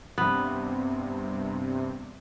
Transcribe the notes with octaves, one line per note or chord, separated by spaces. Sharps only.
G2 C3 B3